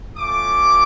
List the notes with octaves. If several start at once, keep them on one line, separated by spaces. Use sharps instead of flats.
A3 C#4 F4 D6